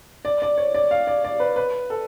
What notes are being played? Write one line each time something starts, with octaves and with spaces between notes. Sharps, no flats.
D5
D5
C#5
D5
F5
D5
D5
B4
B4
A4